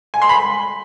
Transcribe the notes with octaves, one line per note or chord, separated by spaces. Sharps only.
G#5
C6
B5